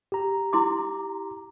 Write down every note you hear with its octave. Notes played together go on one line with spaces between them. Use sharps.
G4 A#5
E4 C6 D6